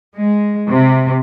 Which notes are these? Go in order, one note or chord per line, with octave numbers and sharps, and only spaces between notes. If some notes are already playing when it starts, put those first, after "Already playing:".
G#3
C3